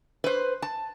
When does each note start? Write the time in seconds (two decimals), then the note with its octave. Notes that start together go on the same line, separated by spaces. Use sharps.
0.24 B4 C5
0.62 A5